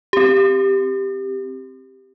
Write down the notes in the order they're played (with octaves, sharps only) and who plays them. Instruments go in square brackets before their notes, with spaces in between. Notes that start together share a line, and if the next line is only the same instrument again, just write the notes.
[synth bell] C4 G4